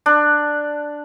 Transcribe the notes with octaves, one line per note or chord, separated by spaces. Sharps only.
D4